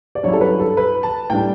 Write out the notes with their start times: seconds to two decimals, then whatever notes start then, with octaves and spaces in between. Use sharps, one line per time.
0.15 D5
0.23 G2 F#3 C#4 E4 C#5
0.33 A4
0.41 B4
0.60 A4
0.77 B4
1.03 A5
1.30 A2 G3 D4 G5